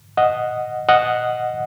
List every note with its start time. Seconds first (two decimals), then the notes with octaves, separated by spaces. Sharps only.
0.17 D#5 F#5
0.89 D#5 F#5